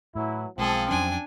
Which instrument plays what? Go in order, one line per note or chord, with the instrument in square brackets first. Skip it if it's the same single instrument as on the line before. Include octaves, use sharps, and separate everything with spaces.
[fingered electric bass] A2 [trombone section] E3 F#3 E4
[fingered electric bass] B1 G#3 [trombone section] F3 [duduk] C4 [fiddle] G#4 A4
[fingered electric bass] F2 F#3 C#4 [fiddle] D4 G#5